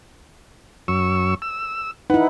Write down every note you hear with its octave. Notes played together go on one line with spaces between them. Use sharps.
F#2 C#6 E6
E6
D#4 E4 B4 F#5